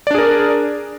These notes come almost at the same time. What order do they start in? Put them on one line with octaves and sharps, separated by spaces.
D5 D4 G#4 A#4